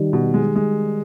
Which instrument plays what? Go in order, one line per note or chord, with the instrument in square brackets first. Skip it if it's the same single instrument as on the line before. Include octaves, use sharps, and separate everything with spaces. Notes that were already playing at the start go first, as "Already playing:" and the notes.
Already playing: [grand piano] D#3 G3
[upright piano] B2
G#3
G#3